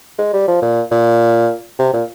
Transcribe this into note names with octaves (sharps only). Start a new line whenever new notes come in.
G#3
G3
F3
A#2
A#2
C3
A#2